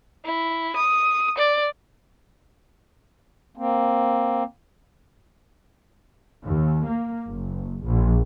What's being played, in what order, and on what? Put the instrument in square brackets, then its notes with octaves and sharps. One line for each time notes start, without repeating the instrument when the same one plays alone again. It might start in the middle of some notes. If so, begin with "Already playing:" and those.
[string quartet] E4
D#6
D5
[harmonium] A#3 C4
[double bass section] D#2
A#3
F#1
A#1